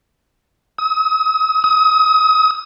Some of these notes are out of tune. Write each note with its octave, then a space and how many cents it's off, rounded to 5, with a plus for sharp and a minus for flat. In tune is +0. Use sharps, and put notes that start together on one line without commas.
D#6 +40
D#6 +30